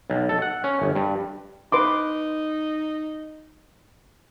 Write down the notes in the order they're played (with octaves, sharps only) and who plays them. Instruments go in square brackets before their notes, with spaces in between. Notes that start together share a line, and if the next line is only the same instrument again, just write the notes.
[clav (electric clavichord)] B1
A4
F#5
C#4
G1
G2
[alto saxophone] D#4 [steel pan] B4 C6 D6